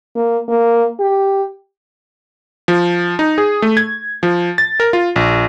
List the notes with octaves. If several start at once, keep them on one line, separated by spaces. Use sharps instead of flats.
A#3
A#3
G4
F3
D#4
G#4
A3
G#6
F3
A6
A#4
F4
A#1